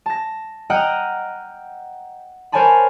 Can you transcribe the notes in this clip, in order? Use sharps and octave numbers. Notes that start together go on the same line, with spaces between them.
A5 A#6
D#5 F#5 G5 A#5 F6
A#4 C5 C#5 G#5 A5 B5